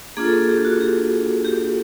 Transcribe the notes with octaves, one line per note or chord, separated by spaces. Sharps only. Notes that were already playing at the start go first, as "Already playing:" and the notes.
A#3 D4 F4 G#4
A4
G#4
G4
F#4
G4
G4
G4